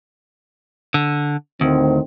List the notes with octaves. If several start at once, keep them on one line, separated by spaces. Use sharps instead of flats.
D3
D2 A2 D#3 C4